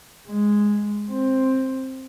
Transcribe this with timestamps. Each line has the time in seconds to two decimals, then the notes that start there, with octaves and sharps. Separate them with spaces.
0.28 G#3
1.11 C4